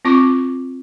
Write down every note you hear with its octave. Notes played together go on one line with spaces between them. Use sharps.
C4 F4 C#6 D6